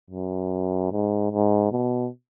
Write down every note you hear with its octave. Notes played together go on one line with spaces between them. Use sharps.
F#2
G#2
G#2
B2